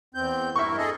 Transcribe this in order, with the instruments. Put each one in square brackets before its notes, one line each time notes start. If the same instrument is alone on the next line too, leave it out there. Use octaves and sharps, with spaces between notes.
[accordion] E2 C4 G6
[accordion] G2 E4 A#4 [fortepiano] E5 C#6
[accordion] G#4 A4 D#5